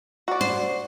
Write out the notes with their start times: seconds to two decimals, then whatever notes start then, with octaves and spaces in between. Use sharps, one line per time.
0.28 F#4 D5
0.41 C5